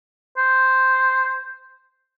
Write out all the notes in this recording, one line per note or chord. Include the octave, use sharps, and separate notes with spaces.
C5